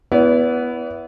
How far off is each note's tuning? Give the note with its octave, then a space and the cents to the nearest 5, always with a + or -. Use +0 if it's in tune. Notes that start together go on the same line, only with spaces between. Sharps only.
B3 +0 E4 +0 D5 -45